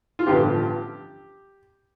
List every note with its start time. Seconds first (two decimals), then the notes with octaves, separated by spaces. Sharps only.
0.19 F4
0.27 A1 G2 D3 F3 B3 G4